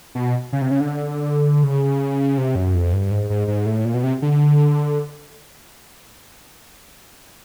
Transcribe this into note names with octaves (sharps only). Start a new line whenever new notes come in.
B2
C#3
C3
C#3
D3
C#3
C3
F#2
F2
G2
G#2
G#2
G#2
A2
A#2
B2
C3
D3